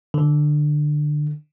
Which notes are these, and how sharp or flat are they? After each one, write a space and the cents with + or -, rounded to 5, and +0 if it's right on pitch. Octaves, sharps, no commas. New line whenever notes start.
D3 +20